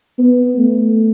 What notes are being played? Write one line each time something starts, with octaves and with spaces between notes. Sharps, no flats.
B3
A3